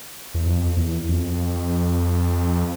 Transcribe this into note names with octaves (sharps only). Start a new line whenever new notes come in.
E2
F2
E2
F2